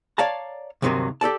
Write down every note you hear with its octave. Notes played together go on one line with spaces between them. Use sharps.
C#5 D5 F5 A5 A#5
D2 G2 C3 D#3 F#3 A#3
G4 A4 D5 A5